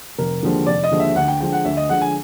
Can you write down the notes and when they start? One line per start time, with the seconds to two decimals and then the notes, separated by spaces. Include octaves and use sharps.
0.18 F1 A#4
0.42 D#2 D3 F3 G#3
0.66 F1 D5
0.83 D#5
0.91 D#2 D3 F3 G#3
1.00 E5
1.16 D2 F#5
1.28 G5
1.40 D3 F3 G#3 G5
1.52 F#5
1.65 D2 E5
1.77 D#5
1.89 D3 F3 G#3 F#5
2.01 G#5